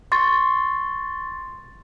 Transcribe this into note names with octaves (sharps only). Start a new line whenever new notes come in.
C6 C#6 A6